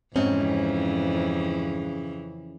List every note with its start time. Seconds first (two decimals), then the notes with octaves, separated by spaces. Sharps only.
0.16 F2 G#2 C#3 E3 C4 C#4